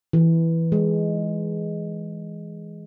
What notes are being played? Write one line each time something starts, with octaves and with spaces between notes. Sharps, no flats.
E3
G#3